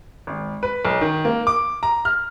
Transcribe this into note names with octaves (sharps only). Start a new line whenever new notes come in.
G#1
B4
B1
D#3
A#3
D6
A#5
F6